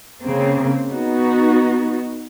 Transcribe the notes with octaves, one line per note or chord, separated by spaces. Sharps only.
C#3 A#3 C4
B3 D#4 F#4